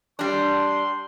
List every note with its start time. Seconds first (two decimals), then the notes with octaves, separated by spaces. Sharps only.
0.19 G3 D4 C6